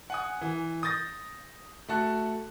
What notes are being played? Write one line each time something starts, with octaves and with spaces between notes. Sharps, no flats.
F#5 G#5 D#6
E3
D#6 G6 A6 A#6
A3 F#4 A5 F#6